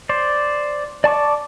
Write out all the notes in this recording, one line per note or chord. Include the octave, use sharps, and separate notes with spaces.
C5 D5
D5 A5 C#6 D6